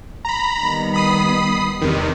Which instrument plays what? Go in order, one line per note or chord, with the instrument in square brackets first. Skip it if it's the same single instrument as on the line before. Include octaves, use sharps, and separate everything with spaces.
[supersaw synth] A#5 B5
[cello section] D#3 G3 B3
[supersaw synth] B5 D#6 C7
[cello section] E2 [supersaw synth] C3 D#3